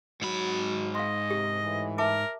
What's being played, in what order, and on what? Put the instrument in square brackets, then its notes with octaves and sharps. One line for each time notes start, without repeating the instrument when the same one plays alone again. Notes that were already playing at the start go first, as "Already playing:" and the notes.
[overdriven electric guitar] G#2 B5 [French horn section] F#3 F#4
[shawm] D#5 [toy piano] F5 C6
[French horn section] F#2 C3 [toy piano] G4
[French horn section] A2 E3
[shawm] A#4 [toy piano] E5 A5 D6